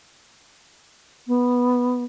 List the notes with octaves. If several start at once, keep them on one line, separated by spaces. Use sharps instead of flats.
B3